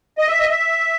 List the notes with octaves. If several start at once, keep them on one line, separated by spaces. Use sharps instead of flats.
D#5
E5
D#5
E5